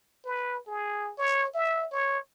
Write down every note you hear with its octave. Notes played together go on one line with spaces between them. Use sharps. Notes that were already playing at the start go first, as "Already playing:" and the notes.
B4
G#4
C#5
E5
C#5